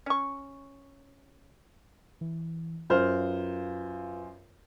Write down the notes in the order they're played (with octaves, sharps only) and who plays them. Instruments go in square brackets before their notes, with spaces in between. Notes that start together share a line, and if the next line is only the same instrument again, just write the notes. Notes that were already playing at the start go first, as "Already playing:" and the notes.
[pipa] C#4 C#6
[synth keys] E3
[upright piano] F#2 C5 F6 [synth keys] F4 B4 F5